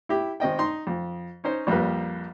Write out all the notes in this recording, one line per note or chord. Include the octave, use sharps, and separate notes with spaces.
E4 G4
G#1 C4 D#5 G5
D#4 C6
F2
C#4 D#4 C5 C#5
A#1 F2 G3 A#3 B4